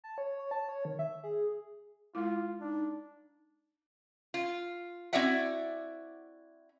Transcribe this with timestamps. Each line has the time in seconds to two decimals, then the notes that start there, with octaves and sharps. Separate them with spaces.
0.04 A5
0.18 C#5
0.39 C#5
0.51 A5
0.69 C#5
0.85 D#3
0.99 E5
1.24 G#4
2.15 G#3 E4 F4
2.61 D4 D#4
4.34 F4
5.13 C4 E4 F#4 D5 E5 F#5